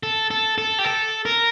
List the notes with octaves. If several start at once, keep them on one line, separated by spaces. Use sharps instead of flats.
A4
A4
A4
G4
A4
A#4